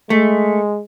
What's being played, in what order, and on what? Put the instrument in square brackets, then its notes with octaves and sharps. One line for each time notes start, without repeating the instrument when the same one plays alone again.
[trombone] G#3 [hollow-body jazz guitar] A3